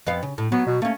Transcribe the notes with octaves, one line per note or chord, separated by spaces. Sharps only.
F2 B3 F5
C#3
A2
F#3 B3
B2
A3 A#3 C#4